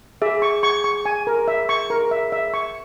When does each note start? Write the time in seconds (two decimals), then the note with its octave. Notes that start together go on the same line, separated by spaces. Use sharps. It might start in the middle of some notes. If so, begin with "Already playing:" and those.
0.22 G#4 E5
0.42 C#6
0.63 C#6
0.84 C#6
1.06 G#5
1.27 A#4
1.48 E5
1.69 C#6
1.90 A#4
2.11 E5
2.32 E5
2.54 C#6